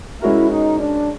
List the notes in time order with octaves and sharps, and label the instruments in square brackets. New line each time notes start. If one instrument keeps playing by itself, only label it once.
[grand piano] G#3 C#4 F#4 A#4 [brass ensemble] E4
[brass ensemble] D#4
D4